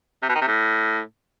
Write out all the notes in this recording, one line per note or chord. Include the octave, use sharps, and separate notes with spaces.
C3
B2
D#3
C3
A2